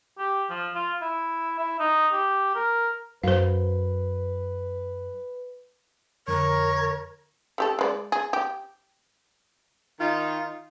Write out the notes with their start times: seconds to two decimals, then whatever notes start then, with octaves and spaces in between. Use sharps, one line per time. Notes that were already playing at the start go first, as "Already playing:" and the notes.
0.18 G4
0.50 F3
0.75 F4
1.02 E4
1.59 E4
1.80 D#4
2.13 G4
2.55 A#4
3.23 F#2 B4 C5 F5
6.28 F2 D3 A#4 C#5
7.58 A3 G4 A4
7.79 G#3 B4 D5
8.12 G#4
8.33 G4
10.00 D#3 D#4 F4